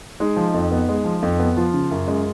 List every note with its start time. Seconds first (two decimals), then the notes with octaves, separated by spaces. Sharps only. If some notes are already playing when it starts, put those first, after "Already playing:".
0.20 G#3 D#4
0.36 F3
0.54 F2
0.71 B3
0.89 G#3
1.05 F3
1.22 F2
1.39 B3
1.57 F3 F4
1.74 C#3
1.91 F#2
2.08 G#3